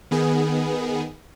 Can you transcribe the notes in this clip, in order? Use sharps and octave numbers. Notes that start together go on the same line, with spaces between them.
D#3 B3 G#4